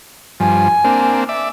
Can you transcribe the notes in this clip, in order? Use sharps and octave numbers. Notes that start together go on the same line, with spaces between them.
G2 F3 G#5
A#3 C4 D4
D5 E5